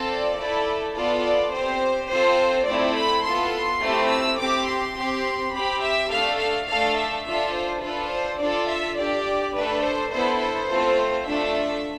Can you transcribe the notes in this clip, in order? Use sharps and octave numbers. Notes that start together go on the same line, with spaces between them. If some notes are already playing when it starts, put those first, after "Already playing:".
Already playing: C4 F4 A4
D5
A3 E4 A4
B3 F4 A4 D5
D5
C4 G4 C5
C4 F4 A4 C5
A3 C4 E4 A4 D5
B5
B3 F4 A4 C6
A3 C4 E4 G4
E6
C4 G4 D6
C6
C4 G4
C4 G4 B5
E5
A3 D4 A4 F5
F5
A3 D4 A4 F5
E5
D4 F4 A4 E5
C5
D4 F4 A4 B4
C5
D4 F4 A4 D5
E5
D4 G4 D5
A3 D4 A4 B4
C5
B3 E4 A4 C5
C5
A3 C4 F4 A4
A3 D4 F4 A4 E5